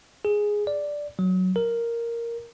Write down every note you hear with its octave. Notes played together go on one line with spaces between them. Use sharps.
G#4
D5
F#3
A#4